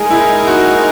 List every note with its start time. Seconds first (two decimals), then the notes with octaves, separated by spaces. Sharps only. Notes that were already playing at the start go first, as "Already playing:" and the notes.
Already playing: G#3 D#4 G#4 A#4
0.11 E4
0.47 F#4